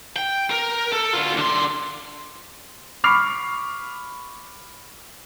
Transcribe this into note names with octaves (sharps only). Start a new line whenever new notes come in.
G5
A#4
A4
D2 F4
D3 C6
B5 C#6 D6 F6 C7 F7